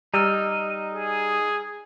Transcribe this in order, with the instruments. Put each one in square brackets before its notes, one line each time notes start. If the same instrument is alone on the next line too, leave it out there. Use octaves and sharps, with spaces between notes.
[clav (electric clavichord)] G3 [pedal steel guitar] D#4 D#5 [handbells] A#5 E6 F6
[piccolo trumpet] G#4